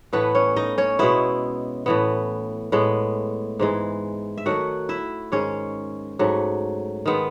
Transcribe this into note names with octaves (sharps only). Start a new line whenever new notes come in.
A2 E3 A3 B3 B4
C#4 C#5
D#4 D#5
C#4 C#5
B2 G#3 B3 E4 E5
A2 E3 B3
A2 G#3 B3
G#2 E3 G#3
E5
D#3 F#3 A3 F#4 F#5
E4 E5
G#2 D#3 G#3 C#4 C#5
G#2 F#3 A3
D#3 G#3 B3